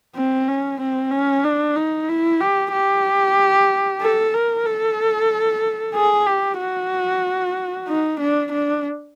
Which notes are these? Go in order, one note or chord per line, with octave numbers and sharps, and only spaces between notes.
C4
C#4
C4
C#4
D4
D#4
E4
G4
G4
A4
A#4
A4
G#4
G4
F#4
D#4
D4
D4